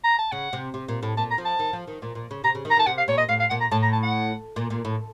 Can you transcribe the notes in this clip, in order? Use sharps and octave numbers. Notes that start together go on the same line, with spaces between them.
A#5
A5
C#3 F#5
C3
C3
A#2
A2
A#2 A5
A#5
F3
A5
D#3
F3
D#3
A#2
A#2
C#3
C3 A#5
C#3
D#3
A#5
D#3
A5
C3 F#5
F5
A#2 C#5
D#5
A2 F5
F5
A#2 F#5
A#5
A2 A5
A#5
A5
F#5
A#2
A#2
A2